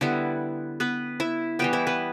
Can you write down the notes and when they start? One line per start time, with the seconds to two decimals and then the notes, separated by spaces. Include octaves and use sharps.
0.01 D3 G3 B3 E4
0.80 B3 B4
1.20 E4 E5
1.59 E3 G3 B3 G4 G5
1.73 E4 E5
1.87 B3 B4